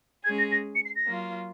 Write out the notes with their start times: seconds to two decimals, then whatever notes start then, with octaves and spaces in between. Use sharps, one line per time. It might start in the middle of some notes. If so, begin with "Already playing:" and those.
0.24 G#3 C#4 G#4 G#6
0.38 A#6
0.51 A#6
0.75 C#7
0.85 C7
0.95 A#6
1.06 F#3 A#3 F4